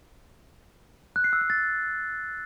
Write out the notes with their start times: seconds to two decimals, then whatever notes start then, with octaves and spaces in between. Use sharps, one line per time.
1.16 F#6
1.24 C7
1.33 E6
1.41 F#6
1.50 A6